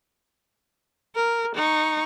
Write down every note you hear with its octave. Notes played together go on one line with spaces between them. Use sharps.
A#4
D#4 C#6